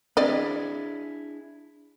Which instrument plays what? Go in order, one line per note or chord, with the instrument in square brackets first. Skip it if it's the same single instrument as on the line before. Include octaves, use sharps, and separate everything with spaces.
[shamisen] C4 D5 D#5 [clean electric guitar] D4 E4 G#4